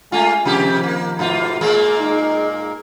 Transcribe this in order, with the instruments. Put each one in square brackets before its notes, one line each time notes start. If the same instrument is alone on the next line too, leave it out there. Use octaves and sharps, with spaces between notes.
[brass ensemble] G#3 G#5 [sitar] A3 F4
[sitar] C3 G4 [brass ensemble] D#3 F3
[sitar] A#3
G#2 B2 F4
A#2 G#3 A#3
[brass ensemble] D#4